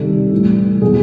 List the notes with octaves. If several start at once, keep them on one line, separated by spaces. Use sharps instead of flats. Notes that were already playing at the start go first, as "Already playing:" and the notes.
Already playing: C3 D#3 G3 A4
A2 E3 G3
B2 F#3 G#4